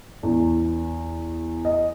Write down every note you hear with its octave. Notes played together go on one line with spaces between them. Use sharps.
E2
D#5